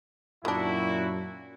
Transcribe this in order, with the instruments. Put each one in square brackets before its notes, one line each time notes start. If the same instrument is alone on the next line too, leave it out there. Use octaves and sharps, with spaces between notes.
[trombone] F#2 [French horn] A#2 [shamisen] D#3 D4 [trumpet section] E4 F#4